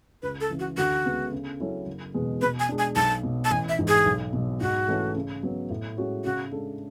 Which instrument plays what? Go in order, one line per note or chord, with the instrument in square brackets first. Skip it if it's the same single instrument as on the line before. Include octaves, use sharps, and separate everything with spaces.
[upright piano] C#2 [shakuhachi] B4
[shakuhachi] A4
[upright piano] C#3 E3
[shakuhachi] F#4
[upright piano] D2 [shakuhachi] F#4
[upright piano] C#3 G#3 B3
C#3
F#3 C#4 E4 A4
F#1
E2 B2 G#3 B3
[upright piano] B2 [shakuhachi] B4
[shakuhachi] G#5
[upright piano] G#3 D4
[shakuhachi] G#5
[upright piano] B1 [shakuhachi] A5
[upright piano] B2 F#3
[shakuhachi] A5
[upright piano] A1 [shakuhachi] G#5
[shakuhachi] E5
[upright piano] G#2 E3
[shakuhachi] G#4
[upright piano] B1
B2 F#3
[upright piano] G#2 [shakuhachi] F#4
[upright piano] E3 A3 C#4 E4
C#3
F#3 B3
A2
G#3 C#4 F#4 C#5
[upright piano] C#3 [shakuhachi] F#4
[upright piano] G#3 D4 A4